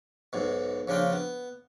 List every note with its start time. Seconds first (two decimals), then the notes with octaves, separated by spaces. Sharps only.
0.33 B1 G#2 B2
0.88 A#1 C#3 D4 F4 G5
1.12 B3